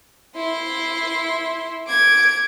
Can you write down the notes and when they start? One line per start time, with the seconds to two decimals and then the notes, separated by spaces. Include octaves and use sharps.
0.36 E4 C6
1.87 D6 G#6